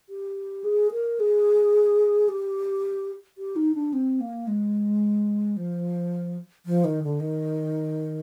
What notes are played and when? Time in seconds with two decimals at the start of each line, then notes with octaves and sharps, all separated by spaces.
0.09 G4
0.64 G#4
0.92 A#4
1.20 G#4
2.29 G4
3.38 G4
3.56 D#4
3.75 D4
3.93 C4
4.20 A#3
4.47 G#3
5.57 F3
6.66 F3
6.84 D#3
7.03 D3
7.20 D#3